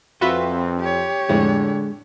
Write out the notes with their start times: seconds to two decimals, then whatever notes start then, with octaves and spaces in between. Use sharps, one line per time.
0.21 F2 C4 F4 F#4 B4 E5
0.80 G4 C#5
1.29 F2 A2 D3 G#3